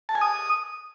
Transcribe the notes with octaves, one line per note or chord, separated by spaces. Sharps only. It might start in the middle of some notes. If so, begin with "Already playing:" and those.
A5
G#5
D#6